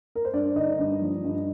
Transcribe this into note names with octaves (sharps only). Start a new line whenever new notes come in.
A#4
C5
G2 D4 D5
D3 D#4 D#5
G2
F3
G2